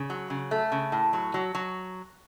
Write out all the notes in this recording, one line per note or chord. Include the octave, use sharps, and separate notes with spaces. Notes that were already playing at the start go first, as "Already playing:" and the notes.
Already playing: C#3
F#3
C#3
A3
C#3
A2
F#3
F#3
F#3